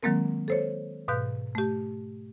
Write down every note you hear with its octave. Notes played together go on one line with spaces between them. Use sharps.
D#3 F#3 G#3 A#3 C4 A#4
A4 C5 C#5
G#2 B2 B4 F5 F#6 G6
A3 G4